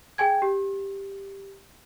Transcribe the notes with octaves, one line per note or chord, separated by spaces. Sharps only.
G#4 G5 G#5 G#6
G4